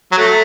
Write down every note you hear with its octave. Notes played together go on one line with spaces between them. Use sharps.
F#3
A3